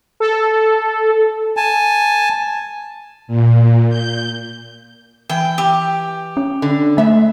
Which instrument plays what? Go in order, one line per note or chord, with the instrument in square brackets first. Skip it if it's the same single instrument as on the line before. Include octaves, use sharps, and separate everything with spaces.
[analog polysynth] A4
[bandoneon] G#5 A5
[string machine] A#2
G6
[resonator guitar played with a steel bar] E3 [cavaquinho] G5
[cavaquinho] G4
[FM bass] C#4
[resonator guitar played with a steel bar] D3
[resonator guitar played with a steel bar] G#3 E5 [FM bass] A3